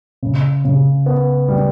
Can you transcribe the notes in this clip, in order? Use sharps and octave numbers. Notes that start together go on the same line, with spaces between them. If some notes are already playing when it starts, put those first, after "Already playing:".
C#3
C#3
B3
G3